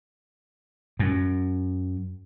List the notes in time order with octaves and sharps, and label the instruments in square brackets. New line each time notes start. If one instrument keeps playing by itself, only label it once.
[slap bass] F#2